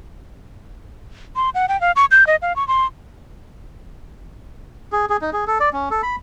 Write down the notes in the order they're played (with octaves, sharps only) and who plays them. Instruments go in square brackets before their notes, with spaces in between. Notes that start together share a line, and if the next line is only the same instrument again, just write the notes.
[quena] C6
F#5
G5
F5
C#6
G6
D#5
F5
C#6
C6
[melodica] G#4
G#4
D#4
G#4
A4
D5
C#4
A4
B5